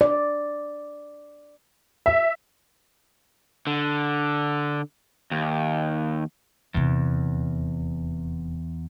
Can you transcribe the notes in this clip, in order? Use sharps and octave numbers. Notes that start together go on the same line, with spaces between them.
D5
E5
D3
D#2
D#1 E2 C3